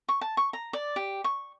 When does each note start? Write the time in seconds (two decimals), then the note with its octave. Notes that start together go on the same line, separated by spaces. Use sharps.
0.09 C#6
0.21 A5
0.37 C#6
0.53 A#5
0.73 D5
0.96 G4
1.24 C#6